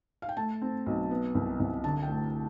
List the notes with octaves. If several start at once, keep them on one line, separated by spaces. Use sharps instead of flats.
F5
G5
A3 A5
C4
B1
B3
C2
C2
D3 A5
G5
A3